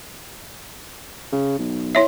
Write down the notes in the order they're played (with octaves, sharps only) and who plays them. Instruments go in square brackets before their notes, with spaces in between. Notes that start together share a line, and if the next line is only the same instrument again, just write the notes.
[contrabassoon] C#3
B1
[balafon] E4 C#5 E5